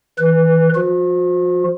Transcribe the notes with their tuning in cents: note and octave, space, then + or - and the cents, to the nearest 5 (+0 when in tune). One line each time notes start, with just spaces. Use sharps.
E3 -30 B4 +0
F3 +0 F#4 -45